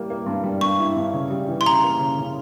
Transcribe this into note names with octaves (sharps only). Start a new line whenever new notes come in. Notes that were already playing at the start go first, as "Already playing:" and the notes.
Already playing: G3 A#3 E4
A#3
G2
G3
G2 C#6
E4
G2
C#3
G3
E3
C6
C#3 A#5
A#3
C#3
C#3